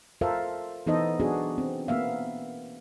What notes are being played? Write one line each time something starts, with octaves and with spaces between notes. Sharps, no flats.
F4 A4 A#4 C5 E5 F5
E3 B3 D#4 A4 C5 D#5
B3 D4 F#4 G#4
C4
A#3 B3 E5 F5